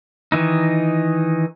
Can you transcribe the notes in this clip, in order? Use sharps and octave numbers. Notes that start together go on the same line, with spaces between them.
D#3 E3 D#4